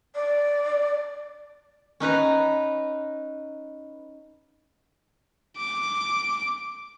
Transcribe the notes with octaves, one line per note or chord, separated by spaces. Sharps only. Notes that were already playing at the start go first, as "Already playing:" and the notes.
D5
C#4 D#4 B4 A#5
D6